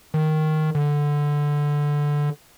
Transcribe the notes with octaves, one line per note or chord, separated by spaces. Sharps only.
D#3
D3